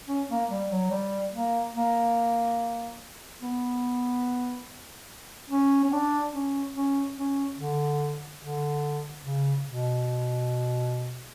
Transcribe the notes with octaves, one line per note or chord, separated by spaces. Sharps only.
C#4
A#3
G3
F#3
G3
A#3
A#3
B3
C#4
C#4
D4
C#4
C#4
C#4
D3
D3
C#3
B2